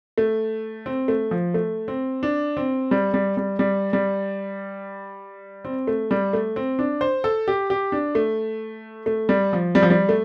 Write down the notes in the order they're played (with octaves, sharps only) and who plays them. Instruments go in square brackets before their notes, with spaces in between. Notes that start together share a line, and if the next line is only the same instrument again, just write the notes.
[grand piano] A3
C4
A3
F3
A3
C4
D4
C4
G3
G3
G3
G3
G3
C4
A3
G3
A3
C4
D4
C5
A4
G4
G4
D4
A3
A3
G3
F3
G3
F3
G3
A3